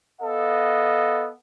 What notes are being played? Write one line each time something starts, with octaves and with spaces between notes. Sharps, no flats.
B3 A4 D#5 F5